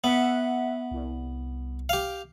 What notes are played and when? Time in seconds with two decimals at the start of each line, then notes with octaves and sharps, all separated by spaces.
0.04 B3 E5 F#5
0.91 C2
1.89 G4 F5